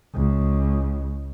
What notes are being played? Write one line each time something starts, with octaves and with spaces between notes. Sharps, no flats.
C#2